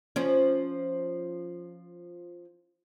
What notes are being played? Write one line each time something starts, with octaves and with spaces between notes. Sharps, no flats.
F3 C#4